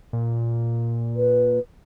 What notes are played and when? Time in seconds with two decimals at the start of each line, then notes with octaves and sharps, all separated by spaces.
0.13 A#2
1.16 B4